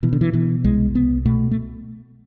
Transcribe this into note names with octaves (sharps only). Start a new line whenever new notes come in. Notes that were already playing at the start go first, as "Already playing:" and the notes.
B2 E3
D3
E3
B2 E3
C2 G#3
C2 B3
B2 A3
A3